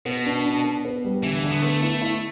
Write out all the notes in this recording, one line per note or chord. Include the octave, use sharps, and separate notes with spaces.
B2 B3
D4
D4
B3
B3
G3
D3 E3
D3
B3
A3 B3
E4
E4